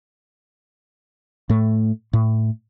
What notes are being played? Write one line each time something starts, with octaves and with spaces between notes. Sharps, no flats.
A2 A3
A2